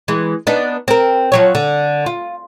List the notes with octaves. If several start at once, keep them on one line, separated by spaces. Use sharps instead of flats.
E3 G#3
B3 D4 D#4
C4 A#4
F3 F#3 C#5
D3
F4